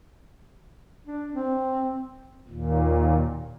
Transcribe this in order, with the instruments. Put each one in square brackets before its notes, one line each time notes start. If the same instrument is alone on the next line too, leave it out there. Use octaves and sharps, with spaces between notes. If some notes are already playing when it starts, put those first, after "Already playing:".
[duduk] D4
C4
[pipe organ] D#2 A#2